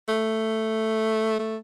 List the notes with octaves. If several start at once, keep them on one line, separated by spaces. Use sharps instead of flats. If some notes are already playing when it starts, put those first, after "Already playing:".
A3
A3